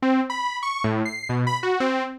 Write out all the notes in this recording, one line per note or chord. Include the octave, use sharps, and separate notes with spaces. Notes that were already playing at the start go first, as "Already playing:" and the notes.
C4
B5
C#6
A2
C7
B2
B5
F#4
C4